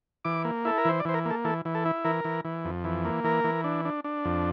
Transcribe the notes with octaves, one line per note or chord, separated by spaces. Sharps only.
E3 D6
A#3
E4 A4
A#4
E3 C5
D5
E3 C5
A#4
A#3 A4
E3 A4
E3
A4
E4
E3 A#4
E3
E3
F2
E3
A#3
E3 A#4
E3
D4
D4
D4
F2